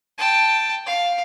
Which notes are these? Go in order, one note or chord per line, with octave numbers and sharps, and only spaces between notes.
G5 A5
F5